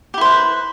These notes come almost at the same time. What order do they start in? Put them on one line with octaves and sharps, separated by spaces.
G4 E4 C5 B4